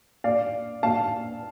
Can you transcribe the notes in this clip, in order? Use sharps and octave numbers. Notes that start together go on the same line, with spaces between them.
D5 F5
F5 A5